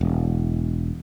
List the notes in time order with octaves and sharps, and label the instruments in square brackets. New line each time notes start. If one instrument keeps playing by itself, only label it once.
[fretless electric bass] E1